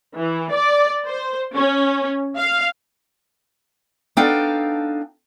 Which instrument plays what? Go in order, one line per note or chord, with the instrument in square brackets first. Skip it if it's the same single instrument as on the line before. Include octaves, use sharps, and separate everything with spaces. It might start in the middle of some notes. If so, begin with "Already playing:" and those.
[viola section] E3
D5
C5
C#4
F5
[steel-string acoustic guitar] B3 D4 D#4 A4 F5 G5